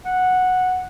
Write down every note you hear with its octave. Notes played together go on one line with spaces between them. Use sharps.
F#5